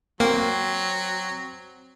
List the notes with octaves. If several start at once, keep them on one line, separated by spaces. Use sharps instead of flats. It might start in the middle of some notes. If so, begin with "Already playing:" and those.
F#3 A#3 C4